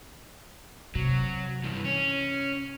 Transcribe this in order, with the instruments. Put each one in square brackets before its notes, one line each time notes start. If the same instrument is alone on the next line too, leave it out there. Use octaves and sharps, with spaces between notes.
[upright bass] C3 [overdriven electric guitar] F#3
[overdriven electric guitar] G2 E3
C#4